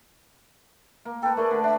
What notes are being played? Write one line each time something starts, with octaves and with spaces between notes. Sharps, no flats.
A#3
A4 B4 G5
A3 G#4 A#4 D5
D3
D4 E5